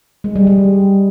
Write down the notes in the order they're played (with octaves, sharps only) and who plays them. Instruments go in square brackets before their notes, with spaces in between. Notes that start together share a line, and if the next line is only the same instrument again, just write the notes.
[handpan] G#3
G3
G3